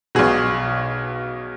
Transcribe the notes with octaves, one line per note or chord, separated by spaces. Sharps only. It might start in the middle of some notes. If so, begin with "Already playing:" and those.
B1 B2 G#4